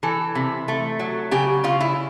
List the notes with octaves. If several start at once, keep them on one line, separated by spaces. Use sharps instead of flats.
E3 A4
C3
A3
F#3
C#3 G4
C#3 F4
E4